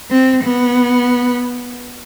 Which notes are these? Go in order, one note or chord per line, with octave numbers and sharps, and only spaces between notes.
C4
B3